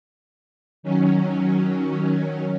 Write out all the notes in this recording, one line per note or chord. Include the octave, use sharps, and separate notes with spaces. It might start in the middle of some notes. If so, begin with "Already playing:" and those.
D#3 F#3 C#4